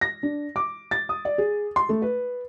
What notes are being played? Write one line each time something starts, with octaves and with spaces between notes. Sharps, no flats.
A#6
D4
D6
A6
D#6
D5
G#4
C6
A3
B4